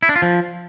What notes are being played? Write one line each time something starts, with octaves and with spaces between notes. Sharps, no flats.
E4
D4
F4
F3